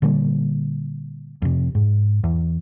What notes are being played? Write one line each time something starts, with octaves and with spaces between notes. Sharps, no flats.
A#2 D3 G3 A#3
F2 C3
G#2
E2